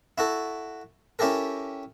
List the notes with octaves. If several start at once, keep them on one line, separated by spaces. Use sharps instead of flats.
E4 F#4 A4
C#4 E4 G4 A4 A#4